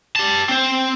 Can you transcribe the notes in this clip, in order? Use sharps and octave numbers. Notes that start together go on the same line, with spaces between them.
G4 A5
C4 C5